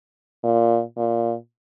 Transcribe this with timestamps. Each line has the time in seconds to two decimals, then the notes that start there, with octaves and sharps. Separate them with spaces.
0.44 A#2
0.97 A#2